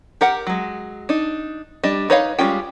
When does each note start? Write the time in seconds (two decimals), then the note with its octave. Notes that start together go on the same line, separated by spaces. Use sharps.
0.21 G4 A#4 F#5
0.47 F#3 G#3
1.09 D4 D#4
1.84 G3 D4 D#5
2.10 D#4 B4 C#5 D#5 F5
2.39 G3 G#3 C#4 F4 G5